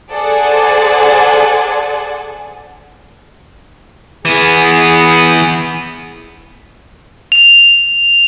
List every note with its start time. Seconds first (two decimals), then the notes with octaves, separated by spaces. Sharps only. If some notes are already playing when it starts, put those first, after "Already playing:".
0.11 G#4 A4 C5 D5 F#5 G#5
4.25 E3 B3 G#4
7.32 F7